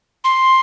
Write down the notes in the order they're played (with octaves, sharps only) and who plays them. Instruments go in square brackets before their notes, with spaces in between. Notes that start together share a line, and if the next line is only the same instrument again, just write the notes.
[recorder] C6